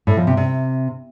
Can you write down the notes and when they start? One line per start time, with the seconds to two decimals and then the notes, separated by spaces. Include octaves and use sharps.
0.07 A2
0.17 F3
0.27 C3
0.37 C3